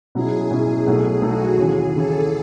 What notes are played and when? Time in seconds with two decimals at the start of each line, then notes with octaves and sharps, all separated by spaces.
0.15 B2 F#3 C#4 E4 G#4
0.51 B2 F#3 C#4 E4
0.86 B1 B2 A3 D#4 G#4 A4
1.22 B1 B2 A3 D#4 F#4 A4
1.57 D#2 C#3 E3 G#4
1.93 D#2 C#3 E3 A4